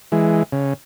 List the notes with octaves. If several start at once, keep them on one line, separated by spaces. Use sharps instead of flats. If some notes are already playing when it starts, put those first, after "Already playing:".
E3 G#3
C#3